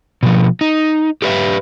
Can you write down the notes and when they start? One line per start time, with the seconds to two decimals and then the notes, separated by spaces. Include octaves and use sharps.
0.23 B2 F3
0.61 D#4
1.22 G4 A4 B4 D5 E5 F5